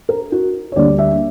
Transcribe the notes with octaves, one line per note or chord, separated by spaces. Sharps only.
A#4
F#4
C#5
D2 D3 G3 A#3 D5
E5